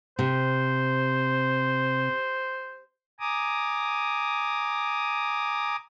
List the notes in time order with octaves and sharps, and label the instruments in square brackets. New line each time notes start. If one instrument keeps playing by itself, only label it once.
[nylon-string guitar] C3 [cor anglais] C5
[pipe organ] G#5 A#5 D6 D#6